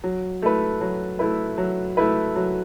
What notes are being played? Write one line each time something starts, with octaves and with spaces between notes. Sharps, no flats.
F#3
A3 E4 B4
F#3
A3 E4 B4
F#3
A3 E4 B4
F#3